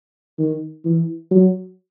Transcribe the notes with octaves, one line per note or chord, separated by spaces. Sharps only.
D#3
E3
F#3